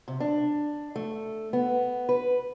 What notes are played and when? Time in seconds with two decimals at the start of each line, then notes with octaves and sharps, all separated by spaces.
0.08 C3
0.20 D4
0.96 A3
1.53 B3
2.09 B4